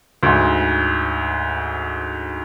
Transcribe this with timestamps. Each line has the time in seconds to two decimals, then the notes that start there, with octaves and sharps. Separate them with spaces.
0.23 D2 G#2